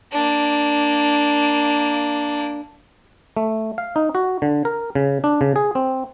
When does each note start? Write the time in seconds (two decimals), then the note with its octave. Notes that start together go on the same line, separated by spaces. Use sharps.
0.12 A#3 D4
3.37 A3
3.78 F5
3.96 D#4
4.15 F#4
4.42 D3
4.65 A#4
4.95 C#3
5.24 D4
5.41 C#3
5.56 G#4
5.75 C4